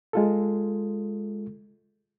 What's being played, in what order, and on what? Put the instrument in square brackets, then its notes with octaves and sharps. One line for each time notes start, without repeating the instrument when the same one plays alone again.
[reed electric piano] G#3 F4 A4